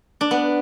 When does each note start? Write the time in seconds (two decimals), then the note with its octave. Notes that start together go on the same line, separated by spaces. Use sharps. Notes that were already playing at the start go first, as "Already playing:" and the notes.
0.21 D4
0.31 B3